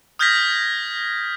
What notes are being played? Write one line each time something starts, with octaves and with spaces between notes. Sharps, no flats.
D#6 F6 G6 G#6 A#6 B6